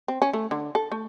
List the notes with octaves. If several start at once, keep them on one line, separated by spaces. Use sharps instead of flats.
C4
C#4
A3
D3
A4
A3